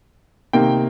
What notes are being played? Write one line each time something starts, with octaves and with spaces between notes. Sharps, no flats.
C3 D#3 A#3 G5